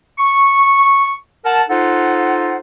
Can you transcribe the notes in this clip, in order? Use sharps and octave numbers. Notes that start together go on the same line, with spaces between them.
C#6
A#4 F#5 A5
D#4 F4 A4 C5 F#5